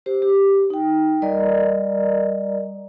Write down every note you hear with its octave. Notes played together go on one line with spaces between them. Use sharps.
G4 C5
G4
D#4 G5
G3 A#4 D5 D#5 A#5